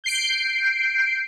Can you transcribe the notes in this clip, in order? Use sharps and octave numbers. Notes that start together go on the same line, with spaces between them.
G6 C7 D7